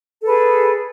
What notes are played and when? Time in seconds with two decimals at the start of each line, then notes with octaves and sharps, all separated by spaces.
0.21 A4
0.24 B4
0.27 G#4